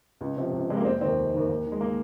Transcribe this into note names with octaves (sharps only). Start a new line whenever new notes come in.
C#2
C3 F3
C#2
C3 F3 G#3
A#3
F1 C4
D#2 D#3 C4
F1
D#2 D#3
D#2
D#3
G#3
A#3